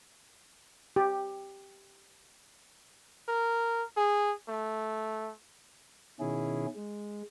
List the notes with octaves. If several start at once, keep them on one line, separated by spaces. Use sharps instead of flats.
G4
A#4
G#4
A3
B2 D#3 C#4 E4 G#4
G#3